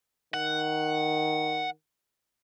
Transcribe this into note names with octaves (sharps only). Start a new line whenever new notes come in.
D#3 F#5